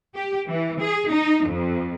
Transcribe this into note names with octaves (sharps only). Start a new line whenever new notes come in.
G4
E3
G#4
D#4
F2